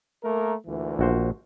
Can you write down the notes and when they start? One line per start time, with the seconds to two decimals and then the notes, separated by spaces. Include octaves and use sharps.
0.24 A3 A#3 A#4
0.67 D2 A#2 E3
0.99 A#1 F#4 C5